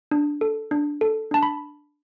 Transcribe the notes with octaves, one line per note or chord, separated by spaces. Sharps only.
D4
A4
D4
A4
D4 A5
B5